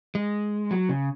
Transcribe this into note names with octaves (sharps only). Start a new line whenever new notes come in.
G#3
F#3
C#3